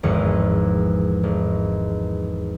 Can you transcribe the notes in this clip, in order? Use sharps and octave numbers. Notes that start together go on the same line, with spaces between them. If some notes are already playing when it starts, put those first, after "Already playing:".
G#1 E2 G#2 F3 C#7
G#1